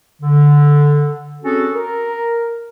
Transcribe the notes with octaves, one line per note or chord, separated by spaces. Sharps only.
D3
C4 C#4 F#4 G#4 A4
A#4